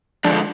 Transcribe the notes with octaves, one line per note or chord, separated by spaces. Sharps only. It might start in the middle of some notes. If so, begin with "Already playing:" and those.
F2 D3 F3 G#3 D4